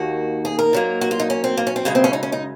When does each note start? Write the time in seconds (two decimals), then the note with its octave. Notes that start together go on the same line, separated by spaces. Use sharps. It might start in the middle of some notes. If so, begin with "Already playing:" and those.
Already playing: D#2 D#3 A#3 F#4
0.45 G#4
0.59 A#4
0.73 G#2 F#3 A#3
1.01 F#4
1.11 F4
1.20 D#4
1.30 C#4
1.44 C4
1.57 A#3
1.67 C#4
1.76 C4
1.85 F#2 C#3 G#3 A#3
1.95 C4
2.04 C#4
2.13 D#4
2.23 C#4
2.32 D#4